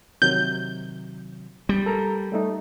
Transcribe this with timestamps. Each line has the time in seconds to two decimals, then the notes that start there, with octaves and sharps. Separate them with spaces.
0.22 C3 D#3 F#3 G6
1.69 G3
1.86 A4 A#4 A#5
2.32 G3 A3 D#4